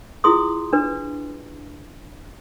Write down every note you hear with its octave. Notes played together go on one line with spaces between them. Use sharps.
E4 F4 G#4 C6 D#6
D4 B4